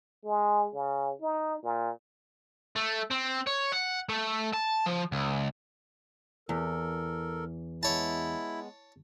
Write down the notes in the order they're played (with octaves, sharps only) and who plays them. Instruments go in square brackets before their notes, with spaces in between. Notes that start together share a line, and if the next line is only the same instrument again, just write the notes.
[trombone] G#3
C#3
D#4
A#2
[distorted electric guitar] A3
C4
C#5
F#5
A3
A5
F3
C#2
[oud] E2 [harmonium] A4 A#4
[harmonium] G#3 B3 [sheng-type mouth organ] E4 [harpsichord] C#5 A5